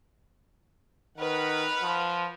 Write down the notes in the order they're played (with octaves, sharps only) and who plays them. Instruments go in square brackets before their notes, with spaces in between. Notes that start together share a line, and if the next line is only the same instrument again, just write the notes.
[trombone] D#3 [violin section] B4 F#5 F6
[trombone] F3